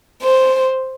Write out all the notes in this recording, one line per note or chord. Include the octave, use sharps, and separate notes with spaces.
C5